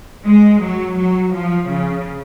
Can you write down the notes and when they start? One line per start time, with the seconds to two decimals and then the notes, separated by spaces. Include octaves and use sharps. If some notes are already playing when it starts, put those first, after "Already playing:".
0.25 G#3
0.61 F#3
0.96 F#3
1.33 F3
1.69 C#3